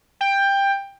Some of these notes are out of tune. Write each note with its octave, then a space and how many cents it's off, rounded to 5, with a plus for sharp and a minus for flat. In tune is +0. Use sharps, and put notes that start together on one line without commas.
G5 +15